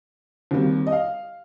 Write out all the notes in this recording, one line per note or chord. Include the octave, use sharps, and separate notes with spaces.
D#2 D#3 G3 C4
D#5
F5